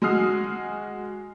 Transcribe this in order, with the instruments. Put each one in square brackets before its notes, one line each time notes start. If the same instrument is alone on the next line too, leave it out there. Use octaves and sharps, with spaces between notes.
[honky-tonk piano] G#3 F#4 D#6 F6 C7